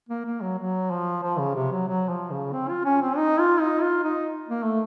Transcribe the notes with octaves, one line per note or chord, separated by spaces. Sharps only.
A#3
A#3
F#3
F#3
F3
F3
C#3
C3
F#3
F#3
F3
C#3
C4
F4
C#4
C4
D#4
F4
D#4
F4
D#4
A#3
A3